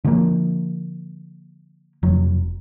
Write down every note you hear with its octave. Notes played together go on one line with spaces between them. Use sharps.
D3 F3 G3 A#3
F1 F#3